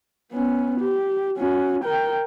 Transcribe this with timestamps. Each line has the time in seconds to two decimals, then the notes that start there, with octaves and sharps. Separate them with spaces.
0.32 B3 C#4
0.80 G4
1.38 C#4 F#4
1.84 A#4 G5